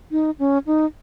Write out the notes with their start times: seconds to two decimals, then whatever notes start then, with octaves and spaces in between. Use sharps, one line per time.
0.11 D#4
0.39 C#4
0.66 D#4